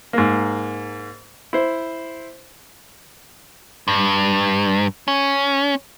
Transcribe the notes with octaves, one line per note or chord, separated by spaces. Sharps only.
G#2 A#3
E4 C5
G2
C#4